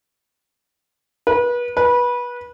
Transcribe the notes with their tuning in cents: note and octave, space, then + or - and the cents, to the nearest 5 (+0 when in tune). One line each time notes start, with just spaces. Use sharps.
B4 -30
B4 -20